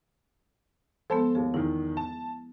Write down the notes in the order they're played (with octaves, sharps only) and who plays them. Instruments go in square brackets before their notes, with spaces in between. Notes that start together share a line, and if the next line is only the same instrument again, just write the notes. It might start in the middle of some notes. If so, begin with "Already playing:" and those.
[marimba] F3 G#3 B3 [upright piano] A4 C5 A5
[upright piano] D#2 [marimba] G#4
[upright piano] E2 D#3 [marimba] E4
[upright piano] A5